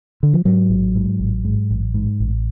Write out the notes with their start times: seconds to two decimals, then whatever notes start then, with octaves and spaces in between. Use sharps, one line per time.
0.23 D3
0.33 F3
0.45 G#2 F#3
0.70 A1
0.95 G#2
1.20 A1
1.45 G#2
1.71 A1
1.94 G#2
2.20 A1